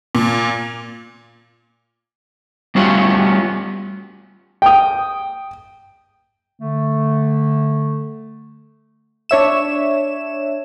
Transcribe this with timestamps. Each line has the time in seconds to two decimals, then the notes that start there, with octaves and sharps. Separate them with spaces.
0.15 A#2
2.75 G3 A3 B3 C#4 F4 F#4
4.62 G5 D#6
6.60 D3 A3
9.29 D4 C#5 E5 E7